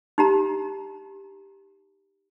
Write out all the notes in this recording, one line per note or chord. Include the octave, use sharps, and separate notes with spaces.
D#4 G4 A#5